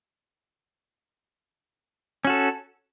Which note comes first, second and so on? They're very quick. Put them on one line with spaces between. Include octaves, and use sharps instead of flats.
C#4 F#4 A4